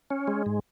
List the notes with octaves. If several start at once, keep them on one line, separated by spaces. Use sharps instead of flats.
C#4
G#3
G#2